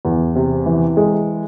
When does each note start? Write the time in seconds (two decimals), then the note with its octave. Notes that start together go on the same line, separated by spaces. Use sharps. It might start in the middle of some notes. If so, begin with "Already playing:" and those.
0.05 E2
0.35 C3
0.66 E3
0.97 G#3